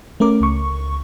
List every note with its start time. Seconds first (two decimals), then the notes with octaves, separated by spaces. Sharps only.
0.20 A3 C#4 A#4 D6
0.41 C#2 C#6